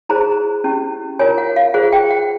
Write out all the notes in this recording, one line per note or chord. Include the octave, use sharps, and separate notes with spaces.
E4 G#4 C5 A#5
C#4 E4 G4
F4 A#4 C#5 G#5
F#5
F5
F4 G#4 C5 F#5
G5
F#5